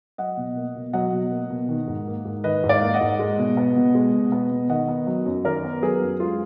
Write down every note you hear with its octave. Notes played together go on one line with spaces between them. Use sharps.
F#3 D#5 F#5
B2
A#3
B2
F#3 D#5 F#5
B2
A#3
B2
D#3
G#2
A#3
G#2
D#3 B4 D#5
G#2
D5 F5
A#3
D#5 F#5
G#2
G#3
B2
B3
B2
G#3
B2
B3
B2
D#3 D#5 F#5
B3
F#3
F#2
D#3 A#4 D5
B3
F#3 G#4 B4
F#2
G#3 F4 G#4